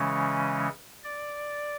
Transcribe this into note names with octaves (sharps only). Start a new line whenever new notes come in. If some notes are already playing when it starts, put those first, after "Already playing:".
Already playing: C#3 E3 G#3 C#4
D5